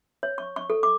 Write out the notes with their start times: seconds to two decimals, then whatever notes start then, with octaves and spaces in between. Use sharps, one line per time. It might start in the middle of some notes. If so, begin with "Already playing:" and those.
0.23 C#5
0.38 C#6
0.56 C#6
0.70 A4
0.83 D6